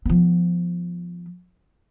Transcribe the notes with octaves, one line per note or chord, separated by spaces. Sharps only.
F3 B3